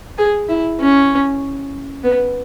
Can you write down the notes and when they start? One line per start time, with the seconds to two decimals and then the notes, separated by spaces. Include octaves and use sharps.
0.18 G#4
0.49 E4
0.80 C#4
2.04 B3